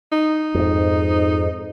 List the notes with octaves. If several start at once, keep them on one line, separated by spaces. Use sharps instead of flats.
D#4
F2 G#2